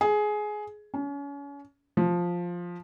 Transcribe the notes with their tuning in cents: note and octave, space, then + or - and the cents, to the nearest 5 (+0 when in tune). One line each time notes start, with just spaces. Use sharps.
G#4 +15
C#4 +35
F3 +5